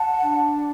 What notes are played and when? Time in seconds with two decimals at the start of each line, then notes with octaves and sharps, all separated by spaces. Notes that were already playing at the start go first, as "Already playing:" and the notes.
Already playing: F#5 A5
0.21 D4